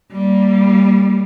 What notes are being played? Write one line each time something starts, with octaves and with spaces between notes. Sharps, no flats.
G3 A#3